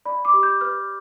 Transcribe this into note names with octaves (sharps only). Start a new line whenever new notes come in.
D5 B5
D6
G4
G6
B4 F6